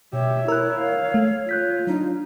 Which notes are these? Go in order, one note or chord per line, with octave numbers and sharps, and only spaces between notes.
B2 G4 C#5 E5
E4 A#4 E6 F#6
F5
A3
F4 F#6 G6 B6
F#3 D4 D#4